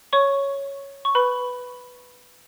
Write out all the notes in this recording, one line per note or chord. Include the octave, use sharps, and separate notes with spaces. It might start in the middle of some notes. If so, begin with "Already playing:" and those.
C#5 C#6
C#6
B4 B5